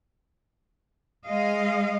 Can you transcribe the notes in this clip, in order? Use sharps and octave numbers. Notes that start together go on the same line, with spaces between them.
G#3 D#5 F5